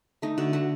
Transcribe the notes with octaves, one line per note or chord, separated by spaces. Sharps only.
A3 D#4
D3 F#4
A3 F#4